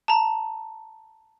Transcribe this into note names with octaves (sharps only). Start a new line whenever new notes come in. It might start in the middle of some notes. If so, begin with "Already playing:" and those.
A5 A#5